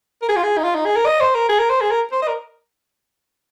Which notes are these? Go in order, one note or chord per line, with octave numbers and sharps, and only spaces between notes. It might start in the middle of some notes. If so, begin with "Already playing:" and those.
A#4
G#4
F4
G#4
D#4
F4
D#4
G#4
A#4
D#5
C5
A#4
G#4
A#4
C5
G#4
A#4
C5
D#5
A#4